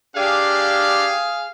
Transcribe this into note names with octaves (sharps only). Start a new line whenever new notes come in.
D4 G4 G#4 F5